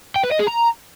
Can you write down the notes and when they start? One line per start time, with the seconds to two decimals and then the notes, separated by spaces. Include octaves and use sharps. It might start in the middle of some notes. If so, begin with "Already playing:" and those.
0.16 G5
0.23 B4
0.31 D#5
0.39 G#4
0.47 A#5